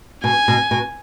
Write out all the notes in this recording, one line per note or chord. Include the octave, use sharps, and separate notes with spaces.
B2 G#5
B2
B2